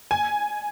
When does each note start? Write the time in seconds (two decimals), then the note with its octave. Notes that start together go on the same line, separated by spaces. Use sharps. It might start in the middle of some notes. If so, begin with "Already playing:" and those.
0.11 G#5